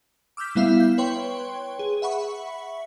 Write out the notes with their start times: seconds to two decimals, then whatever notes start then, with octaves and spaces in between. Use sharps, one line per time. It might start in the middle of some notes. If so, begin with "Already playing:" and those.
0.37 D6 E6 F6 G6 B6
0.55 G3 B3 E4 E5 F5 C7
0.80 G6
0.98 B4 C#5 G5 C6 C#6
1.79 G#4
2.02 E5 F#5 B5 C#6